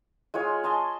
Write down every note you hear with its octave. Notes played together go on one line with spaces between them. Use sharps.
G#3 F4 C#5 G#5
D#5 G#5 A5 C6